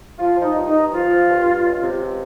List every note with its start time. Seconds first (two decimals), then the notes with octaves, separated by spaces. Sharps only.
0.19 F3 F4
0.37 F3
0.42 D#4
0.55 G2
0.67 D#4
0.73 G2
0.91 F3 F4
1.09 F3
1.27 G2
1.45 G2
1.63 C#2
1.81 C3
1.98 C#2